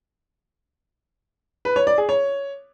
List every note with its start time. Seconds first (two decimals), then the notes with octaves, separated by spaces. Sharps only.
1.65 B4
1.76 C#5
1.87 D5
1.98 G#4
2.09 C#5